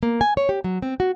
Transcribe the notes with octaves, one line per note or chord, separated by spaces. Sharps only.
A#3
G#5
C#5
G4
F#3
C4
F#4